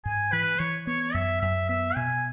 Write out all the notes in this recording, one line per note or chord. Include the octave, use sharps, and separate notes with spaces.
G#2 G#5
E3 B4
E3 C#5
B3 C#5
C#5
F#2 E5
F#2 E5
B3 E5
B2 G#5